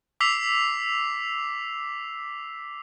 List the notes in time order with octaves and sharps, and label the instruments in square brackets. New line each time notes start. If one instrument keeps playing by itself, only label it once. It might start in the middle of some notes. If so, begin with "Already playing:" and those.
[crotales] D6 E6 B6 C7 F7